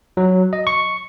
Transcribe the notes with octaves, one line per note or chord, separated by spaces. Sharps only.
F#3
D#5
C#6